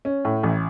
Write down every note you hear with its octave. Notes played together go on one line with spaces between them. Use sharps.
C#4
A2
A1